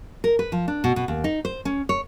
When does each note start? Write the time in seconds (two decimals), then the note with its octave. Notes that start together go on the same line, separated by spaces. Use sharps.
0.24 A#4
0.39 B4
0.52 F3
0.68 D4
0.84 B2
0.96 B2
1.08 D#2
1.24 D#4
1.45 C5
1.65 C#4
1.89 C#5